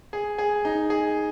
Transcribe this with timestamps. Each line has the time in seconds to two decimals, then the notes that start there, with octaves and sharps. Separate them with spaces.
0.13 G#4
0.38 G#4
0.65 D#4
0.90 G#4